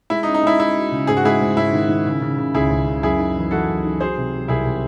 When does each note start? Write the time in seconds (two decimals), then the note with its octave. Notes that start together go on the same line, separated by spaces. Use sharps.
0.10 G#3 E4
0.23 D#4
0.27 C#4
0.34 D#4
0.43 G#3 E4
0.59 G#3 E4
0.76 F#4
0.92 C#3
1.07 G#2 G#4
1.17 F#4
1.24 G#3 E4 G#4
1.40 G#2
1.56 G#2 E4
1.73 D#3
1.89 D#3
2.06 C#3
2.22 C#3
2.38 C#3
2.54 C#2 E4 G#4
2.70 C#2
2.87 C#3
3.03 F#2 E4 G#4
3.19 D#4
3.36 E3
3.51 E3 F#4 A4
3.68 F#2
3.84 D#4
4.00 F#3 G#4 C5
4.17 C3
4.33 F#3
4.48 C2 E4 G#4
4.65 C3